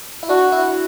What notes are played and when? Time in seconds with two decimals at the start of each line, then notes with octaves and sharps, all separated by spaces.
0.23 E4
0.29 D4 F#4
0.52 E4